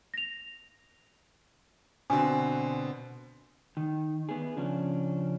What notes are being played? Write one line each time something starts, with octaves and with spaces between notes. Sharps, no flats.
A#6 F7
B2 D3 C4 G#5
D#3
B3 G#4
C#3 F3 C#4 D4